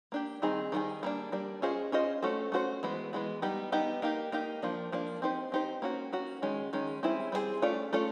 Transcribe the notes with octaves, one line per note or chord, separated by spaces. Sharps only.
A#3 D4 G4
D#3 G3 C4 D#4 G#4
D#3 G3 C4 D#4 G#4
G3 A#3 D4
G3 A#3 D4
C#4 F4 G#4 C5 D#5
C#4 F4 G#4 C5 D#5
A3 C#4 F#4 A4 C5
A3 C#4 F#4 A4 C5
E3 G#3 B3
E3 G#3 B3
G3 B3 D#4 G4
G3 B3 D#4 G4
A#3 D#4 G4
A#3 D#4 G4
F3 A#3 D4
F3 A#3 D4
C4 D#4 G4 C5
C4 D#4 G4 C5
A#3 C#4 F#4
A#3 C#4 F#4
D#3 G#3 C#4
D#3 G#3 C#4
G3 C4 E4 G#4 C5
G3 C4 E4 G#4 C5
A3 C#4 F4 A4 D5
A3 C#4 F4 A4 D5